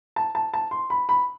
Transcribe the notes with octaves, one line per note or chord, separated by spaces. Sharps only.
A5
A5
A5
C6
B5
B5